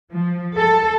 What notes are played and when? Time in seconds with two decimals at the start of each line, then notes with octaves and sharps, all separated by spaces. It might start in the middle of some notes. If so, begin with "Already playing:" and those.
0.13 F3
0.57 A4